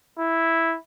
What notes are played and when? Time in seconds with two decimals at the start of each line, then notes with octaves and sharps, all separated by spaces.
0.19 E4